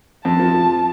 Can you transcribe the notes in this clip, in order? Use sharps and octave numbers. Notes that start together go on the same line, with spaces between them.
F2 A5
F3